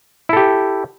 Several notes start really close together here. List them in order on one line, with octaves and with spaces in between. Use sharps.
E4 A4 G4